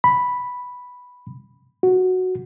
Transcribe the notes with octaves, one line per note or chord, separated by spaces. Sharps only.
B5
F#4